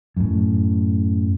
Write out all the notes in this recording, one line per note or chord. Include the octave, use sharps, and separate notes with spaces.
F#2 A2